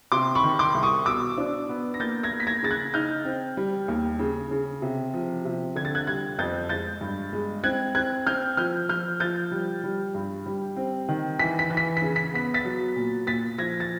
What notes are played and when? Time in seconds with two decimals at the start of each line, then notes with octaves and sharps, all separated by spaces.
0.12 C3 C6 D6
0.35 B5 C#6
0.43 D#3
0.59 C6 D6
0.74 C2
0.83 C#6 D#6
1.06 B2 D6 E6
1.38 D4
1.69 B3
1.94 A#6
2.00 A#3 G6 A6
2.23 G#6 A#6
2.31 A#3
2.40 B6
2.47 G#6 A#6
2.63 C#3 A6
2.71 F#6 G#6
2.94 D#4 F6 G6
3.25 C4
3.57 G3
3.88 D#2
4.19 C#3
4.51 C#3
4.82 C3
5.13 F3
5.45 C3
5.76 D3 G#6
5.85 A6
5.95 F#6 G#6
6.07 G3 F#6 G#6
6.39 F2 G6 A6
6.69 G#3 G6 A6
7.01 G2
7.33 G#3
7.64 C4 F#6 G#6
7.95 C4 F#6 G#6
8.27 C4 F6 G6
8.57 F3 F6 G6
8.89 F3 F6 G6
9.20 F3 G6 A6
9.51 G3
9.84 G3
10.15 G2
10.46 G3
10.76 C4
11.08 D#3
11.39 E3 B6
11.59 B6
11.70 E3
11.77 B6
11.97 B6
12.02 C#3
12.16 B6
12.34 B3 B6
12.54 A6 B6
12.65 F#3
12.96 A#2
13.27 A#2 A6 B6
13.58 F3 G#6 A#6
13.80 A6